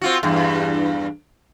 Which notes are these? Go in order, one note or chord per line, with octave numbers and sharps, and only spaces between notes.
C4 F4 F#4
E2 G2